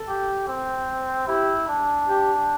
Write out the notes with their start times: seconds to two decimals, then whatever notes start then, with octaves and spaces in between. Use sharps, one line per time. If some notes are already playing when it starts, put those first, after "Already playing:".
Already playing: A4
0.08 G4
0.48 C4
1.28 E4 G4
1.69 D4
2.08 G4